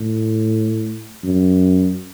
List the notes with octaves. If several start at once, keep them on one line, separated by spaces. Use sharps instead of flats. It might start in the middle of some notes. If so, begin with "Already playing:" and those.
Already playing: A2
F#2